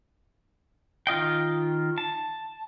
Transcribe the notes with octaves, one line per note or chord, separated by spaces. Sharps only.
D#3 F4 D#5 G5
A5